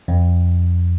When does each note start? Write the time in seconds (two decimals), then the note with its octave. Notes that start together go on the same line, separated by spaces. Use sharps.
0.08 F2